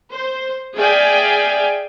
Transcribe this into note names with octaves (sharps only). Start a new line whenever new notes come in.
C5
G#4 D5 E5 F5 G5 G#5